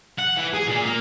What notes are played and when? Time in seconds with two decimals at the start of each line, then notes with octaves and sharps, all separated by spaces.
0.19 F#5
0.37 E3
0.54 G#4
0.68 A#2
0.85 A#3